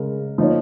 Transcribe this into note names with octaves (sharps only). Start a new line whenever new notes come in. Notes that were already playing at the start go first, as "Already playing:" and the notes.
Already playing: C#3 G#3 C#4 A#4
F3 A#3 D#4 C#5